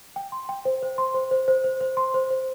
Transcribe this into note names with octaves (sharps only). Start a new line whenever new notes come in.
G5
C6
G5
C5
C5
C6
C5
C5
C5
C5
C5
C6
C5
C5